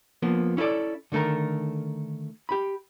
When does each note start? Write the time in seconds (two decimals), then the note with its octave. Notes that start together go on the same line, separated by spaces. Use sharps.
0.22 F3 A#3 B3
0.57 C#4 E4 G#4 A4 D5
1.12 D3 D#3 A3 A4 A#4
2.49 G4 B5